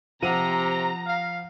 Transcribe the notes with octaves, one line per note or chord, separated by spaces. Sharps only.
C3 F3 F#5 A#5 D#7
F5